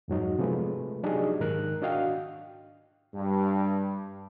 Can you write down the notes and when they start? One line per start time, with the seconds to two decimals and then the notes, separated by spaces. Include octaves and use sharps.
0.08 F2 G#2 F#3 D#4
0.39 C3 F3 G#3 A3 B4
1.03 F#3 D4 D#4 G4 G#4 D#5
1.40 G#2 D#3 A#4 F#6
1.82 D4 F#4 D#5 F5 G5
3.14 G2